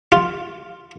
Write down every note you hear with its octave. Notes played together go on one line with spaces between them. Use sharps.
F4